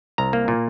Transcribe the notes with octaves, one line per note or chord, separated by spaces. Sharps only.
C2 A#5
A#3
A#2